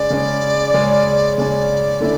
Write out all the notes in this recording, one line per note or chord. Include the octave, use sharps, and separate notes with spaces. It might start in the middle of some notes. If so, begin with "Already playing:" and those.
Already playing: C#3 G#3 C#4 D5
C#3 G#3 C#4
C#3 G#3 C#4
C#3 G#3 C#4 D5
D3 A3 C#4 E4